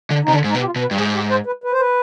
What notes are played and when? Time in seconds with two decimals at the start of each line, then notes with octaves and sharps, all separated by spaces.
0.10 D3
0.24 D#4
0.28 C3
0.32 D3 D4
0.44 G#2
0.49 D#4
0.55 B2
0.61 G4
0.66 F4
0.76 B2
0.81 B4
0.91 G2
0.98 G#2 G#4
1.14 G4
1.30 C5
1.46 B4
1.64 B4
1.72 C5
1.80 B4